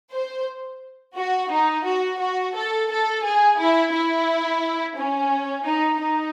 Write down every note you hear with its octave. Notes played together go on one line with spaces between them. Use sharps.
C5
F#4
D#4
F#4
F#4
A4
A4
G#4
E4
E4
C#4
D#4
D#4